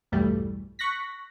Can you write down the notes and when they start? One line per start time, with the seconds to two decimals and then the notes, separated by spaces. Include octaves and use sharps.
0.12 B1 E2 G2 E3 G3 A3
0.79 C#6 F#6 A#6 B6